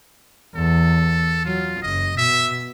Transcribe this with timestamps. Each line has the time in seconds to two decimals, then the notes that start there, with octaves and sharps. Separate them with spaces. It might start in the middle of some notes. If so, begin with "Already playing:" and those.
0.55 E2 A4
1.45 F#3 F4
1.83 F#1 D#5
2.17 B2 E5